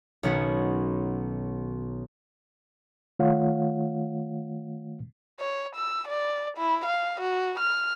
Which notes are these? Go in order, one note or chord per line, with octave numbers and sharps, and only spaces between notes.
B1 D#3 C#4 D#4 F#4 B4
D#3 A3 F4 C#5 F5 F#5
C#5
E6
D5
E4
F5
F#4
F6